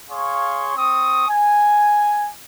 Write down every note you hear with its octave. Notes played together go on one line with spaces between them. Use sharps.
G#4 C#5 F5 C6 C#6
C4 C#6 D#6
G#5